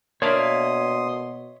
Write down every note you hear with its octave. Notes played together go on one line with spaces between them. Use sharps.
B2 A#3 D4 C#5 E5 F5 C6 D#6